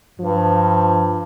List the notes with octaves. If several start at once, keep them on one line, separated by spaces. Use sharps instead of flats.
G2 F3